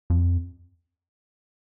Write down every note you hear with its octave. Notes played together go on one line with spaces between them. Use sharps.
F2